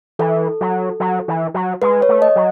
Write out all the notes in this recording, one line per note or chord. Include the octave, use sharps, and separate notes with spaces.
E3 A4
F#3
F#3
E3
F#3
G#3 B4
C#5
A3
D#5
F#3